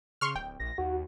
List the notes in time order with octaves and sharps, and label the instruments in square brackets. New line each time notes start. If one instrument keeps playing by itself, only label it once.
[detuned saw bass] C#3 [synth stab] C6 C#6 F6
[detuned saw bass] D1 [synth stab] G5
[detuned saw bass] A#1 [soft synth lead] A#6
[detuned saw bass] D#2 [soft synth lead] F#4